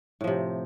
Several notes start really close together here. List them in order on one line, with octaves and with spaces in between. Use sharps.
A2 F3 C3